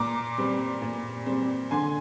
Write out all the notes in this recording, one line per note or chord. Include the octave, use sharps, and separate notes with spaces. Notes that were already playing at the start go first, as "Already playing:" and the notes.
Already playing: A#2 A#5 D6
G3 C4
A#2
G3 C4
D3 G#5 C6